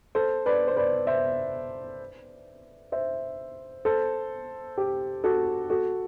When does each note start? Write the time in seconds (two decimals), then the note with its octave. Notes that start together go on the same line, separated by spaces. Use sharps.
0.15 A4 C5
0.46 B4 D5
0.68 C5
0.76 B4 D5
1.07 C5 E5
2.92 C5 E5
3.85 A4 C5
4.78 G4
5.24 F#4 A4
5.70 F#4 A4